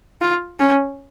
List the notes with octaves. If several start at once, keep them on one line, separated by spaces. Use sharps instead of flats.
F4
C#4